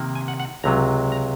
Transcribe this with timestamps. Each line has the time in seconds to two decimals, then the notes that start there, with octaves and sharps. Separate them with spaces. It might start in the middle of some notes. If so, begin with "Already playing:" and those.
Already playing: C3 D#3 A#3
0.15 G#5
0.28 F#5
0.40 F#5
0.64 C#2 C3 F#3 A#5
1.12 A#5